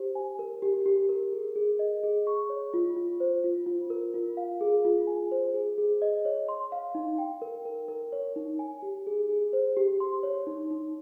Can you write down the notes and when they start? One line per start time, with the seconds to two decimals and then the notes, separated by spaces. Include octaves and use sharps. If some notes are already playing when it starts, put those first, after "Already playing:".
Already playing: G4 C5
0.15 G#5
0.39 A#4
0.62 G4
0.86 G4
1.09 A#4
1.32 G#4
1.56 G#4
1.79 D#5
2.03 G#4
2.27 C#6
2.50 C#5
2.74 F4
2.96 F4
3.20 C5
3.44 F4
3.66 F4
3.90 A#4
4.14 F4
4.37 F5
4.61 G#4
4.85 F4
5.07 G#5
5.31 C5
5.54 G#4
5.78 G#4
6.02 D#5
6.25 C#5
6.49 C6
6.72 F5
6.95 D#4
7.18 G5
7.42 A#4
7.65 A#4
7.88 A#4
8.12 C#5
8.36 D#4
8.59 G#5
8.82 G4
9.07 G#4
9.29 G#4
9.53 C5
9.77 G4
10.00 C6
10.23 C#5
10.47 D#4
10.71 D#4